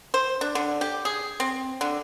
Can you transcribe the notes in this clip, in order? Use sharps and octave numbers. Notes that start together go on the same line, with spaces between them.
C5
D4
D3
G4
G#4
C4
D3